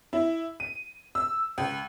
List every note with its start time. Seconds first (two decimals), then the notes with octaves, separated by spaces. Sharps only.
0.13 E4
0.60 D#7
1.15 E6
1.58 C#2